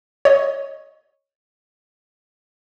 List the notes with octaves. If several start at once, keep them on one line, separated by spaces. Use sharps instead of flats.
C#5 D#5